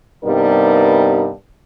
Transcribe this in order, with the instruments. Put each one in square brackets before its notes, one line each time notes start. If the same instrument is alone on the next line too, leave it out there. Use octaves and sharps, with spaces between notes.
[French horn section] G2 C3 G3 B3 D#4 A#4